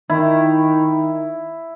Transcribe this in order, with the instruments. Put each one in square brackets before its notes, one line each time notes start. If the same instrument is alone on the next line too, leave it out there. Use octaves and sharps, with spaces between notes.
[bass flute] D#3 [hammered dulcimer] E4